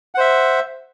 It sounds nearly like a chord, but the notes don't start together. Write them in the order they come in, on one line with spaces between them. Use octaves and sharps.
F#5 C5 E5